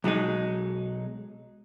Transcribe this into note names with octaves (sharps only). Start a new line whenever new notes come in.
B1 F#3 G#3 D#4